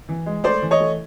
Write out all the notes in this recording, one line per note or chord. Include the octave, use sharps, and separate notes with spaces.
E3
G#3
A3 C5 D5
E3
C#5 D#5
A3